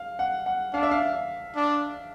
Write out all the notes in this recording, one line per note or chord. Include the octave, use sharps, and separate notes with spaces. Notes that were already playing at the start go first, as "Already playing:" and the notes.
Already playing: F5
F#5
F#5
D4 F5
E5
F5
D4